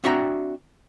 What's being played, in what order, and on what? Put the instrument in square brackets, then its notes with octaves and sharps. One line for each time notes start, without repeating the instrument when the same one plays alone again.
[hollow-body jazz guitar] C4 D4 F#4 E5 G5 A#5